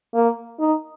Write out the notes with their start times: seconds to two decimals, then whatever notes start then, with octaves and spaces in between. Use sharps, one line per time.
0.14 A#3
0.59 D#4